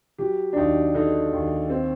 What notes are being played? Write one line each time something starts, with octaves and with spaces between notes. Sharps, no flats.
F#3 G4
D4
D#2 D#4
D3 D#4
D#2
C4